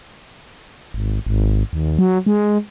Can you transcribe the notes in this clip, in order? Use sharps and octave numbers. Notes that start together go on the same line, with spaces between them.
G#1
G#1
D#2
F#3
G#3